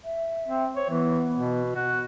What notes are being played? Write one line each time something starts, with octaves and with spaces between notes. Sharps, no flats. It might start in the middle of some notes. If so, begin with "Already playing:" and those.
E5
C4
C5 C#5
E3 B3
B2
F#4